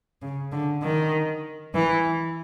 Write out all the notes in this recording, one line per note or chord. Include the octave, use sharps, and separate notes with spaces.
C#3
D3
D#3
E3